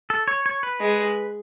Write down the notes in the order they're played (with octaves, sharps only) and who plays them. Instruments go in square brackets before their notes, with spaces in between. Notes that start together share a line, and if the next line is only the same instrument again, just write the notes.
[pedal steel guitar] A4
C#5
C#5
B4
[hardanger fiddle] G#3